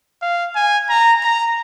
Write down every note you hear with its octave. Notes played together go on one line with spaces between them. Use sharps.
F5
G#5
A#5
A#5